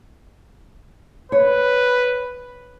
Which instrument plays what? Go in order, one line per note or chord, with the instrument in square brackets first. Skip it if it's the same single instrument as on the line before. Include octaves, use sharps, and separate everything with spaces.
[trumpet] B4 [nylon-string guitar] C#5